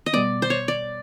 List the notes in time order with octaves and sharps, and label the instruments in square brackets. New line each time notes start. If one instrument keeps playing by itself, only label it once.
[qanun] D#5
[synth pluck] B2 G3 B3 [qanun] D5
[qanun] C5
C#5
D5